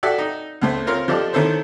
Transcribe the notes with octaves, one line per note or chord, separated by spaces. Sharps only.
F#4 A4 D5 E5 F#5 G5
D#4
C#2 A3 C5
C4 F4 A#4 C#5 C6 F6
F3 D4 G4 A4 D#5
D#3 E4 A4 C5 C#5